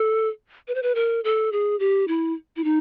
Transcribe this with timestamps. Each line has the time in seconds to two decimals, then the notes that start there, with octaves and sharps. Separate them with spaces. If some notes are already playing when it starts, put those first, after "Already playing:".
Already playing: A4
0.68 B4
0.75 C5
0.83 B4
0.95 A#4
1.24 A4
1.52 G#4
1.80 G4
2.08 E4
2.56 E4
2.64 D#4